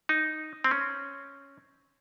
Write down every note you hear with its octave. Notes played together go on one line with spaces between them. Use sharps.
D#4
C4
C#4